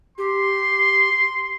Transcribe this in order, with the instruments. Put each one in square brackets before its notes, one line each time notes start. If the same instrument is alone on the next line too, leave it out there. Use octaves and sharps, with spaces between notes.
[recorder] G4 [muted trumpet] C6